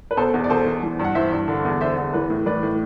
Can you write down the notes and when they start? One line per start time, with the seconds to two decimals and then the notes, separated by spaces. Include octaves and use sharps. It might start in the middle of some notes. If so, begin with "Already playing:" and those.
0.11 B4
0.17 B2 A4 C5
0.34 E2
0.44 D5
0.50 B2 A4 C5
0.66 E2
0.83 E3
0.99 G2
1.04 F#5
1.15 E3 C5 E5
1.32 G2
1.48 D3
1.65 E2
1.81 D3 C5 E5
1.97 E2
2.13 E3 B4
2.30 A2
2.46 E3 B4 D5
2.63 A2